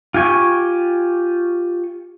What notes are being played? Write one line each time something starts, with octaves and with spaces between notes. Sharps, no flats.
F4 G4 G#5 C#6